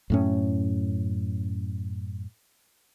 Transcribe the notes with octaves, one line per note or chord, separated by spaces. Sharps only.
F#2 A2 C#4